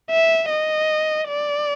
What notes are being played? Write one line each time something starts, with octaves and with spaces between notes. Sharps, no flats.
E5
D#5
D5